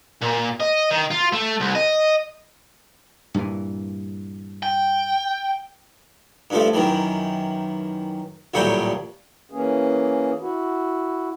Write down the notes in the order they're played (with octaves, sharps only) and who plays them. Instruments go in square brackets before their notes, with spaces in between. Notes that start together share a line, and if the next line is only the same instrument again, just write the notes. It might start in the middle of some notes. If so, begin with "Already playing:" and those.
[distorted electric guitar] A#2
D#5
D#3
F4
A3
C2
D#5
[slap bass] G2 A#2 E3
[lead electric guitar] G5
[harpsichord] G2 F3 A3
F#2 D#3 E3
A1 D2 A#2 F#3 G3 G5
[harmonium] E3 A#3 C#4 G#4
E4 F#4